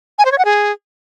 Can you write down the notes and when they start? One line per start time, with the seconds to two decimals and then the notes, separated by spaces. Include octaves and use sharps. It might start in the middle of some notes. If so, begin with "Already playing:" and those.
0.18 G#5
0.25 C5
0.32 C#5
0.38 F#5
0.45 G#4